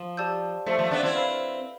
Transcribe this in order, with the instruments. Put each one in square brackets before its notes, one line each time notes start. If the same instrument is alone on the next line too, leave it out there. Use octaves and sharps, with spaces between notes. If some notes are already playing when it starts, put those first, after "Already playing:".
Already playing: [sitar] F3
[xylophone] G4 D5 A5 E6 G6
[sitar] F3 A3 [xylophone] A4 C5 E5
[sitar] F3 A3
B3 D4
C4 E4
[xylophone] B4 F5 B5 F6